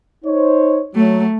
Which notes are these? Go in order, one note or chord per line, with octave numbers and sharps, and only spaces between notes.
D#4 C5 C#5
F#3 A3